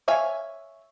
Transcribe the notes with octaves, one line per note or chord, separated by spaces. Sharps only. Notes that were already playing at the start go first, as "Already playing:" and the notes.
C#5 E5 F5 G#5